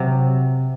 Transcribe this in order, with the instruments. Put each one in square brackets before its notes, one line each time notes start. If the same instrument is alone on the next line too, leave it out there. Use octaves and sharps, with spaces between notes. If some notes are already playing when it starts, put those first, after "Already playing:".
Already playing: [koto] C3 F#3